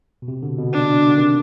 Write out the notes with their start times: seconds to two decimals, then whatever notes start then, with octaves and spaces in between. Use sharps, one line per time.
0.22 B2
0.28 C3
0.42 B2 D3
0.58 B2 D3
0.73 D4
1.07 D3
1.18 C3 D#3